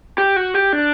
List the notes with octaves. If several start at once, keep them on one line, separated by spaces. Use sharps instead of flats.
G4
F#4
G4
D4